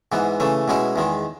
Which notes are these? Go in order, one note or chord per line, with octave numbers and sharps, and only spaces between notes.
G#2 E3 B3
C#3 E3 A3
B2 G#3 C#4 E4
E2 D#3 G#3